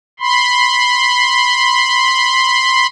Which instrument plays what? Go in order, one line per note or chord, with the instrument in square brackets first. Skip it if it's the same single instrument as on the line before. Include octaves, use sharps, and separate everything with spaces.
[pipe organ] B5 C6